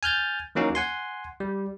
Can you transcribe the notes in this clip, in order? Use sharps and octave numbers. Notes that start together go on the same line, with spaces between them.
G#5 F6 G6 A6
E3 F#3 A#3 C#4 D#4
F#5 G#5 C6
G3